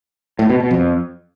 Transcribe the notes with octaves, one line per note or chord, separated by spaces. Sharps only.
A2
B2
B2
F2